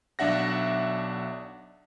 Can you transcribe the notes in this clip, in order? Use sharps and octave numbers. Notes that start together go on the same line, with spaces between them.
B1 D4 E5 F#5 A#6